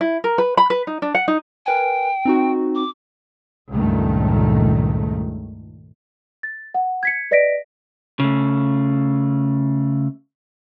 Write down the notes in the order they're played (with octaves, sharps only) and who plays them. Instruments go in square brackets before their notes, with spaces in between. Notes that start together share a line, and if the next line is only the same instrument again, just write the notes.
[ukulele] E4
A#4
B4
B5
B4
D#4
D4
F#5
D#4
[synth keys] A#4 B4 G#5 [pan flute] G5
[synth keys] C4 D#4 F#4
[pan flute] D6
[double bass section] C#2 G2 A#2 D#3 A3
[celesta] A6
F#5
G#6 B6 C#7
B4 D5 D#5 A#6 B6 D7
[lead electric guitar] C#3 A3